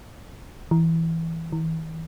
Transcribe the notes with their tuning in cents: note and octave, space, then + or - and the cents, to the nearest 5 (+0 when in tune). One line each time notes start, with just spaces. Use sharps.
E3 -5
E3 -40